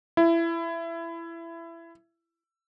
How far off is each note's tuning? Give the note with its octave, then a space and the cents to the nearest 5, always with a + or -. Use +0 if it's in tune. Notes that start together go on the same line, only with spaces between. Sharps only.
E4 +20